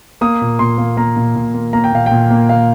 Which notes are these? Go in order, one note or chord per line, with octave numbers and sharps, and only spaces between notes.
A#3 D#6
A#2
A#2 C6
A#3
A#3 A#5
A#2
A#2
A#3
A#3 A#5
G5
A#2 F5
A#2 G5
A#3
A#3 F5